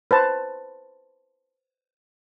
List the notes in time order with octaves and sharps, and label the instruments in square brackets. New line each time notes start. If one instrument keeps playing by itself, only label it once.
[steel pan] B4 C5 A5